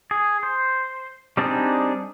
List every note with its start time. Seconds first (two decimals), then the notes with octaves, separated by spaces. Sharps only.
0.11 G#4
0.43 C5
1.37 G3 C4 D4 D#4 G#4